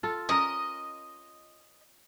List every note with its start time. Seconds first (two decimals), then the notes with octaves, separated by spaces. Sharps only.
0.03 F4 A4
0.29 C#4 A#4 D#5